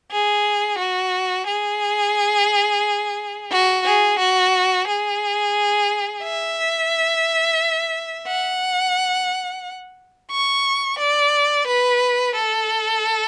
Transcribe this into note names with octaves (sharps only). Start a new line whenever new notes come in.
G#4
F#4
G#4
F#4
G#4
F#4
G#4
E5
F#5
C#6
D5
B4
A4